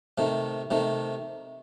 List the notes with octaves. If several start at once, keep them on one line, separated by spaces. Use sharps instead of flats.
C3 D#3 A3
C3 D#3 A3